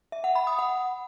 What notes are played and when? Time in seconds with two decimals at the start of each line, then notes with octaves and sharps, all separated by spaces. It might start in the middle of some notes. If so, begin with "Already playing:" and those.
0.12 E5
0.24 F#5
0.35 B5
0.47 D#6
0.59 F#5